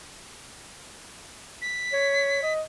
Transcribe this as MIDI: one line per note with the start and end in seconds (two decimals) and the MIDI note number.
1.62 2.53 95
1.93 2.39 73
2.43 2.61 75